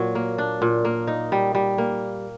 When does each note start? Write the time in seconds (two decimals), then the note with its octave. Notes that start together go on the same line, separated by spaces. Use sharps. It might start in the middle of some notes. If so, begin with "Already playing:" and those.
Already playing: A#2 F#3
0.15 A#3
0.38 D4
0.62 A#2
0.85 A#3
1.07 D#4
1.32 G3
1.55 G3
1.78 A#3